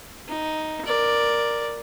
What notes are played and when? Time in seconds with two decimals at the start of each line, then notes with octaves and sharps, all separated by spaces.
0.28 D#4
0.85 A#4 D5